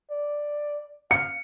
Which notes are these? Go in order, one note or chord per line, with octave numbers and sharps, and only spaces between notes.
D5
F5 C#7